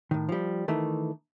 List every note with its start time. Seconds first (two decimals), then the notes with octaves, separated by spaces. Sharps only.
0.11 A2 D#3
0.29 F3 G3
0.68 D#3 E3 A3